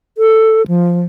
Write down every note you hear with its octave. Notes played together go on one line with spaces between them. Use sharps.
A4
F3